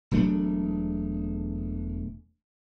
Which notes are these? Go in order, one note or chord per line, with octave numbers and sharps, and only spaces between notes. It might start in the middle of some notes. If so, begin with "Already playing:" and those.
E1 F#3 A3 D4